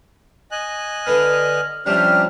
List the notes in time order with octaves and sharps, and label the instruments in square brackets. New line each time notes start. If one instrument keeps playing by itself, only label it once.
[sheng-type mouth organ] D#5 G#5 F#6
[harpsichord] D3 B3 [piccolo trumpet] F6
[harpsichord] C3 F3 G3 [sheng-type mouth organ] C#4 D4 G4 [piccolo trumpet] F6